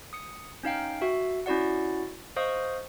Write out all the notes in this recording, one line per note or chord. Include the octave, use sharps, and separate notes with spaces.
D#6 C#7
C#4 D#4 F5 G5
F#4 E5
C#4 E4 F#4 D5 F#5
C5 D#5 F5 C#6 D#6